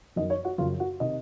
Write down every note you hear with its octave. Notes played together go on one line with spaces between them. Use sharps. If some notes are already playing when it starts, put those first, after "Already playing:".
F#2 D#3 D#5
C#5
F#4
F#2 C#3 F3 F4
F#4
C3 D#3 D#5